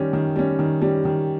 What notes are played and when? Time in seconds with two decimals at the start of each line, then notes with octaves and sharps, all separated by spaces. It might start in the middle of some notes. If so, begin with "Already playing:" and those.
Already playing: D#3 G3 C#4
0.13 D#3
0.36 G3 C#4
0.59 D#3
0.82 G3 C#4
1.05 D#3